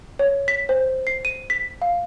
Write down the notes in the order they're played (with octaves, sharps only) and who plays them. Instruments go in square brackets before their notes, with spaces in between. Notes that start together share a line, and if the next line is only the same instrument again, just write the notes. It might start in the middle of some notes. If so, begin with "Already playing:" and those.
[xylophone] C#5
B6
C5
C7
D#7
B6
F5